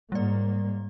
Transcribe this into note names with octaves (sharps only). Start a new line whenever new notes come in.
G#2 G3 A#3 D5